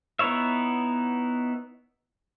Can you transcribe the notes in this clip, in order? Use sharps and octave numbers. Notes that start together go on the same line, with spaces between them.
B3 D#4 E4 C#5 E5